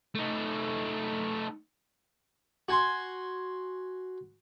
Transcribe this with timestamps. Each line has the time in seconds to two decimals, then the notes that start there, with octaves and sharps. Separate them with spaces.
0.15 A3 D#4
2.69 F#4 G#5 C6